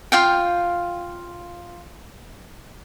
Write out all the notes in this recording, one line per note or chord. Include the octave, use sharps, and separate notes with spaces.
F4 F5 G5